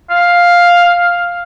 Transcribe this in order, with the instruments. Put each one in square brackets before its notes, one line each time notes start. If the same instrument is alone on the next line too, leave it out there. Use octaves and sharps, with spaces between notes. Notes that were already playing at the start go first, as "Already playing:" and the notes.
[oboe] F5